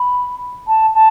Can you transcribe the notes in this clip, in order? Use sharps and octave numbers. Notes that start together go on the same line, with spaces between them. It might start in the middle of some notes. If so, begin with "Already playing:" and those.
Already playing: B5
A5
A5